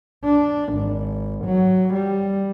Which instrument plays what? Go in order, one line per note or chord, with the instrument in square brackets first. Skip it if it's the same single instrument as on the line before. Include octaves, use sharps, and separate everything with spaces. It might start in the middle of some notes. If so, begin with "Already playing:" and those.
[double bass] D4
G#1
F#3
G3